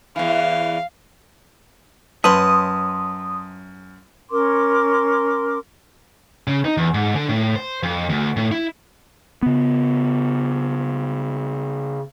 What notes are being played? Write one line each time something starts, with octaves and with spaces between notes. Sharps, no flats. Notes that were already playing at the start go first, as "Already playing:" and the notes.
E2 E3 F5
F#2 B4 C#5 E5 A5 C6 D#6
C#4 A#4 C6 D6
C#3
D#4
E2
G#2
D3
A2
C5
F2
D2
A2
E4
C#3 B3